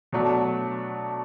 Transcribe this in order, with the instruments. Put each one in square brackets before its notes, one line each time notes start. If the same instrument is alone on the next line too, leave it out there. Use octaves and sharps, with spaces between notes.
[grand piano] B2 F#3 A3 D4